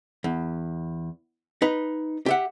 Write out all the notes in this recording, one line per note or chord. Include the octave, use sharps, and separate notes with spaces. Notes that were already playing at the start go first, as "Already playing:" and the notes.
E2
D#4 B4
G4 E5 F#5